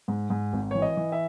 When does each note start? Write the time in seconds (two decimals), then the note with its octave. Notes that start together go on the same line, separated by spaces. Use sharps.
0.08 G#2
0.30 G#2
0.53 G#1
0.71 E3 C#5
0.82 D#5
0.97 E3
1.12 E5